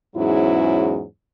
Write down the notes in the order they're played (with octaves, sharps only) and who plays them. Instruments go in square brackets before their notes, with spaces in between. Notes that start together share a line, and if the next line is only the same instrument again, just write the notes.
[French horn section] E2 G#2 F#3 C#4 E4